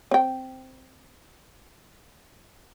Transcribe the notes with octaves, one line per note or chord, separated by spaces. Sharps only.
C4 G5